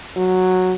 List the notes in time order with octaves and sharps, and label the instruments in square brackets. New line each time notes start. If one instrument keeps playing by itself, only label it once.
[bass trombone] F#3